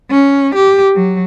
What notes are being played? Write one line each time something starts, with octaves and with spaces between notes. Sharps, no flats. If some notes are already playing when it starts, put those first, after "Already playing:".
C#4
G4
F#3